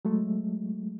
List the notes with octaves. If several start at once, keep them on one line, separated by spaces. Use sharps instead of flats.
F#3 G#3 A3